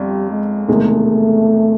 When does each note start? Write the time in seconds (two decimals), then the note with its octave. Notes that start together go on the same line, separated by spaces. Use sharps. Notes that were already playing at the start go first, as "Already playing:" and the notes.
Already playing: G1 F2 G3
0.31 G#3
0.68 E1 E2 C3 D#3 G#3 A3